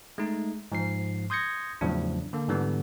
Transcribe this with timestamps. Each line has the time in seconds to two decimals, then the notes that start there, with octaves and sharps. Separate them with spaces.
0.18 G#3 A3 D#4
0.72 G#2 F3 C7
1.30 C6 D#6 G6 G#6 A#6 C#7
1.81 E2 A2 C#3 F3 F#3 D4
2.33 D3 A#3
2.48 G#2 D3 E3 G3 B3